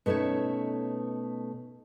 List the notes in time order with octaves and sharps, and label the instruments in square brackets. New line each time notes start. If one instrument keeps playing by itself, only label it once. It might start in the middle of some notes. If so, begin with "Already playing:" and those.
[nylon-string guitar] B2 A3 C#4 D#4 C#5